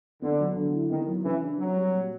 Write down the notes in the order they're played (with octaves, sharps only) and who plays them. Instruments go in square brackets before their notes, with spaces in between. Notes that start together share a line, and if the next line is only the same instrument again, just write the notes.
[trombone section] D3 [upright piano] B3
[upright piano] F#3
D3
E4
[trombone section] D#3 [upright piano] B3
[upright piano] F#3
[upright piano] C#3 [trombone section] E3
[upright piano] D4
[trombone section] F#3 [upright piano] C4
[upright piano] G3
A#2